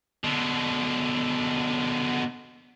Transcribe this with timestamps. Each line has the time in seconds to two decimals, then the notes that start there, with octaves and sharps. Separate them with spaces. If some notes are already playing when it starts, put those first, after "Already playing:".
0.24 B2 D3